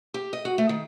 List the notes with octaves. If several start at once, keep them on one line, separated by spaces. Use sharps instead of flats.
G4
D#5
F#4
A3
D#3